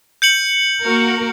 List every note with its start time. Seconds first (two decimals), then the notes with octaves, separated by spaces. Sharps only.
0.22 G6 C#7 F#7
0.83 A#3 F#4 A#4